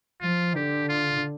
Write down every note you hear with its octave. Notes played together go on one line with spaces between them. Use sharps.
F3 F4
D3 G4
F4